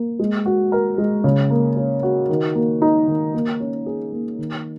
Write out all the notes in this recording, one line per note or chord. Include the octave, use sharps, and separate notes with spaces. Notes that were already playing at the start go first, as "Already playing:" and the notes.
Already playing: A#3
G#3
F#4
A#4
G#3
C#3
A#3
C#4
F#4
D#3
A#3
D#4
D#3
A#3
C#4
G#4
A#3
D#3